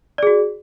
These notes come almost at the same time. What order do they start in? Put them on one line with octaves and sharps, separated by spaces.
D5 G#4 F#4